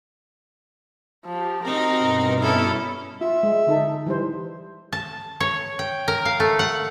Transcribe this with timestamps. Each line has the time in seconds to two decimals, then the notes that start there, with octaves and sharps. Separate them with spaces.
1.26 F3 G4
1.64 C4 D#4 F#4 A#4
1.98 G2 B2
2.40 B3 C#4 E4 A4
3.21 F4 E5
3.43 G#3
3.67 D3 D#4 A4
4.07 E3 G3 C5
4.92 A5
5.40 C#5
5.79 G5
6.08 A#4
6.25 F5
6.40 A3
6.59 F#5